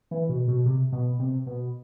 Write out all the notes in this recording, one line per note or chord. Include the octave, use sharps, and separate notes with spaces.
E3
B2
B2
C3
B2
C3
B2